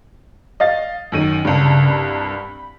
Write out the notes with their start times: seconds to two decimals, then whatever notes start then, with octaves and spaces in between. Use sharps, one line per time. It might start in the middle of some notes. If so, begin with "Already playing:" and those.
0.60 D#5 F5 A6
1.12 F#2 D#3 D#7
1.45 C2 G2 C#3
1.90 B5